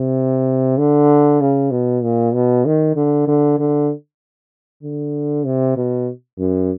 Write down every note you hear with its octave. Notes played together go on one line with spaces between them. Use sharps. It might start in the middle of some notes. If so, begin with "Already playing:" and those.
Already playing: C3
D3
C#3
B2
A#2
B2
D#3
D3
D3
D3
D3
C3
B2
F#2